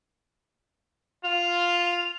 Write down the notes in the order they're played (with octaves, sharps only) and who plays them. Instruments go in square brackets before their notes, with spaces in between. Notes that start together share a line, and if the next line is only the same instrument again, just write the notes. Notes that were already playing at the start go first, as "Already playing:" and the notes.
[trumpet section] F4 [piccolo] F7